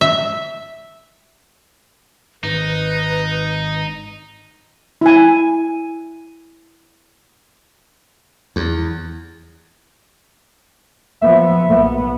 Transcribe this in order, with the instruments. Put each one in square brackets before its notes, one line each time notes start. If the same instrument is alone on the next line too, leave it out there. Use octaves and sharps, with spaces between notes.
[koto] E5
[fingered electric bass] G#1 [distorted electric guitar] D#4 [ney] B4
[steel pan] E4 G#5
[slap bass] E2
[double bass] F3 B3 [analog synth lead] E5
[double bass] B1 B3